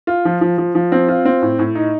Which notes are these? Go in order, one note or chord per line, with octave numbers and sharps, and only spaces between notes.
F4
F3
F3
F3
F3
C4
F4
C4
A2
A2
D#4